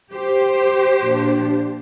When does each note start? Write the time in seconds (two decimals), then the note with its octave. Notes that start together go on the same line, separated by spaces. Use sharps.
0.11 G4 C5
1.02 A#2 F3 D4